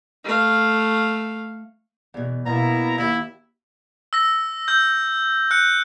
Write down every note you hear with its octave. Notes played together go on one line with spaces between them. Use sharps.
A3 F5
E2 B2
B2 A#3 B3 E4 A#5
D#2 E4
E6 A#6
E6 G6
F#6 C#7